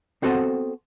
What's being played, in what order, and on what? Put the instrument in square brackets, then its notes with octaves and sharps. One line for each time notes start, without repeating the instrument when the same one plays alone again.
[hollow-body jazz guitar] B3 C4 F#4 A4 C5 D#5